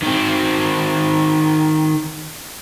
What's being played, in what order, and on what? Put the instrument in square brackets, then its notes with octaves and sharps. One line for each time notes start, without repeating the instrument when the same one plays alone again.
[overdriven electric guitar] D#3 C4